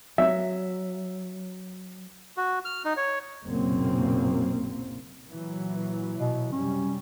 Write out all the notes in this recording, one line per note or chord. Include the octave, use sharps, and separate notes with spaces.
F#3 E5
F#4
F6
D#4
C#5
F#1 B1 F#2 A#2 A#3 C4
A#2 E3 F#3
B2
F#2 C3 G3 C#4